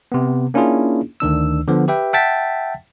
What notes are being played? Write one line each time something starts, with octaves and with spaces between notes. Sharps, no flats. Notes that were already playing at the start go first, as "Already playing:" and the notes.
C3 B3
A#3 C#4 D4 E4 F4 G#4
D2 D#3 D4 E6
D3 F3 B3
G4 B4 E5 G5
E5 F#5 G5 A5 A6 B6